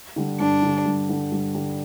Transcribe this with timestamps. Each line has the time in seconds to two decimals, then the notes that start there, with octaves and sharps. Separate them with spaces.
0.16 D3 G3
0.40 G2 D4
0.62 D3 G3
0.85 G2
1.09 D3 G3
1.32 G2
1.55 D3 G3